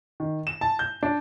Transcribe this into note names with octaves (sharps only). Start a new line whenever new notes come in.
D#3
E7
A5
G6
D4